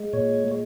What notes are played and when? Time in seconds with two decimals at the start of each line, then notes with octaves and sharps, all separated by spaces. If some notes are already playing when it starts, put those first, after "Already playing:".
Already playing: G#3
0.13 A#2 C#5
0.48 G#3